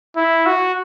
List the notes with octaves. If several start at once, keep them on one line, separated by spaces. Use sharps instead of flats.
E4
F#4